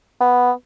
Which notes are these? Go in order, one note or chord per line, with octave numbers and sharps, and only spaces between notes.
B3